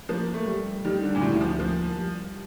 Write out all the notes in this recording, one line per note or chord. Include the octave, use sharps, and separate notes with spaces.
F3 A#3
A3
G3
D#3 G3
D3
A#2
D2 A2
D#3
F3
F3 A#3
G3